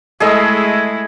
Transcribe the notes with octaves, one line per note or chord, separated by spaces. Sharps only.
G#3 A3 E4 G#4 A4 D#5